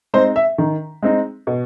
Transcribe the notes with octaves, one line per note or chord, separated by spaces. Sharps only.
G#3 C4 D#4 C5
E5
D#3
G#3 C4 D#4
B2